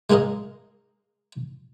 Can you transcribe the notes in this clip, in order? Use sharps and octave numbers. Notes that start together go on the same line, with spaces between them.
G#3 A#3 G#4 A#4 D#5